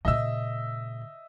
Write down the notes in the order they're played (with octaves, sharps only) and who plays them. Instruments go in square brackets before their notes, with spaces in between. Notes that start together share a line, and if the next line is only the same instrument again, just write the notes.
[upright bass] A#2 C#3 [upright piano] D#5 E5 E6